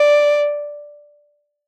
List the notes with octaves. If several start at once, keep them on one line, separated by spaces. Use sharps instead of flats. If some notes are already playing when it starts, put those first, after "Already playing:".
Already playing: D5